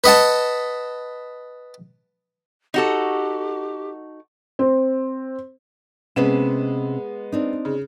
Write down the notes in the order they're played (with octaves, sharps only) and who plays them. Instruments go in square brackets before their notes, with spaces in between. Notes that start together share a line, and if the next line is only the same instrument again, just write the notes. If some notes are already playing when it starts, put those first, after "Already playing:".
[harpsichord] B4 D#5 F#5 A5
[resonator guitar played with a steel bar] D#4 F#4 A4 [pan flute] G4
[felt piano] C4
[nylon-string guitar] C3 C#4 B4 [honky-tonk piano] G#3 B3 E7
[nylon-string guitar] C4 D4 D#4
[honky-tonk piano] C#3